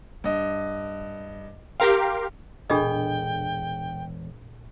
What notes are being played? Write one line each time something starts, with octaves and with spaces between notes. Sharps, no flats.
G2 D#5
G4 A#4 F5 G5 C6
E1 A#2 D4 G#4 A4 D#5 G5 B5